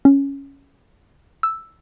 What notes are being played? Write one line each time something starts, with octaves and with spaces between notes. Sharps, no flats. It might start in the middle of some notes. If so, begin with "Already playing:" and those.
C#4
E6